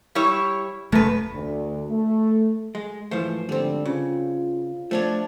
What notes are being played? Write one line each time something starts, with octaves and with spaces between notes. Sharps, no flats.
G3 E4 C#5
F1 F#2 A3 B4
D2
A3
G#3
G#2 E3 F3 A3 C5
D3 G3 C4
C#3 F4
F3 A3 D4 C#5